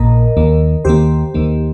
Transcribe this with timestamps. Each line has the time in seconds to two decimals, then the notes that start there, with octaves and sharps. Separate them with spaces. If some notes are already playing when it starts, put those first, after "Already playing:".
Already playing: A#1 A#2 A#3 A#4 D#5
0.37 D#2 D#3 A#3
0.85 D#2 D#3 A#3 G4 C5
1.34 D#2 D#3 A#3